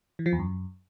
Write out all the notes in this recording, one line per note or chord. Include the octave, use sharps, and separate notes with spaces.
E3
F3
E2
F#2